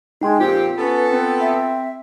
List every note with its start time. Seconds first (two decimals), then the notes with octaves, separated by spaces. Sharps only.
0.21 G#3 D#4 G5 C6
0.40 F2 A#2 C4 F4 G4
0.78 B3 C#4 A4 B4
1.10 C4
1.40 E5